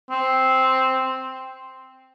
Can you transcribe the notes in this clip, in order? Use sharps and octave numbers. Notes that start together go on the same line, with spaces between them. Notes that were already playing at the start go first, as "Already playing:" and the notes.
C4